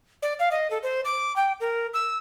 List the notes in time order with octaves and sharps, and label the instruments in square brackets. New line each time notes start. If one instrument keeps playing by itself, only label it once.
[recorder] D5
F5
D#5
A4
C5
D6
G5
A#4
E6